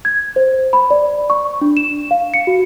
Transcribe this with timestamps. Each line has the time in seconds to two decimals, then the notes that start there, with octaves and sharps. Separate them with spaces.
0.05 G#6
0.36 C5
0.73 B5
0.90 D5
1.30 C#6
1.61 D4
1.77 E7
2.11 F5
2.34 C#7
2.47 F#4